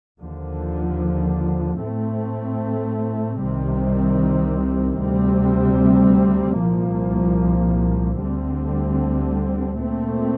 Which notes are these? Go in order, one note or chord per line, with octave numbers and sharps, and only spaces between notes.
D#2 D3 F3
A2 A3 C4
C2 C3 D#3 G3 C4
D2 C3 G3 C4
C2 A#2 F3 A#3
D2 D3 G3 C4
A#2 A3 C4